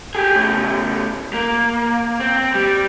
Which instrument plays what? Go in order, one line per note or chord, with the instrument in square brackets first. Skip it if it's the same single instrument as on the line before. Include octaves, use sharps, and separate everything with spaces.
[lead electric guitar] G4 G#4
A2 C#3
A#3
C4
G3